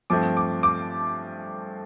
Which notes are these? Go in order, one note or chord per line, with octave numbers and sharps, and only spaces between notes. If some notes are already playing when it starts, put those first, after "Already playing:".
G2 F3 A3 C4 D6
D6
D6